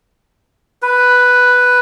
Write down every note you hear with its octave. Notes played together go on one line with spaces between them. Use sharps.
B4